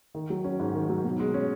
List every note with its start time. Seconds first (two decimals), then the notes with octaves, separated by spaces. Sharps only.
0.15 D#3
0.30 F#3
0.44 C#4
0.60 G#2
0.74 D#3
0.89 F#3
1.04 B2
1.20 G#3
1.34 C#4